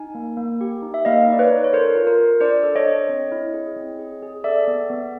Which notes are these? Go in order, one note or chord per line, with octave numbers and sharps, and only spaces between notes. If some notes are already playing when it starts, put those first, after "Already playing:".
Already playing: D#4 G#5
A#3
A#3
G4
D#4
E5
A#3 D#5 F5
D#4 D5
B4 C#5
D#4
C#5
A4 A#4 C5
F4
A#4 C5
F4
D4 C5 D5
A4
C#5 D#5
D4
C4
E4
G#4
C4
G#4
G#4
A4 D5 E5
B3
B3